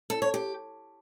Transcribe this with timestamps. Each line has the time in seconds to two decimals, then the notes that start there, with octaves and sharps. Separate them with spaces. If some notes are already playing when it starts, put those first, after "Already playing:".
0.10 A4
0.22 C#5
0.34 G4